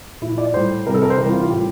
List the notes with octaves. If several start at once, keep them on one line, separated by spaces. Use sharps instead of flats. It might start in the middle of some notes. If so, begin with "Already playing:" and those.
A#2 F3 E4
D5
A2 G3 C5
C3 G3 A#4
A4
A#4
C5
C3 E3 G3 A#4
F4
F4
A2 G3 G4